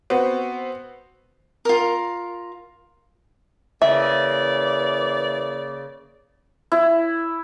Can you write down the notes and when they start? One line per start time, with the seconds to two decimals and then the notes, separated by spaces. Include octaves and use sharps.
0.10 B3 C4 F#4
1.65 F4 A#4
3.82 C#3 E3 A#3 D5 E5
6.72 E4